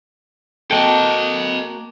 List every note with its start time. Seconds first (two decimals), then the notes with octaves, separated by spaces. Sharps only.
0.71 A#3 F#4 A4 D#5 G5 A5